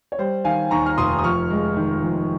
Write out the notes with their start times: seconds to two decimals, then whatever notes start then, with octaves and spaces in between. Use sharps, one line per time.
0.12 C#5
0.18 G3 C5
0.44 D#3 F5 G#5
0.71 D#2 A#5 C#6
0.86 F6
0.98 F1 C6 D#6
1.19 D#6
1.24 F2 C#6 F6
1.50 G#3
1.77 D#3
2.03 F2